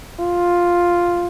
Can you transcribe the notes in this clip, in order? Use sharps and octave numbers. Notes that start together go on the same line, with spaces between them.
F4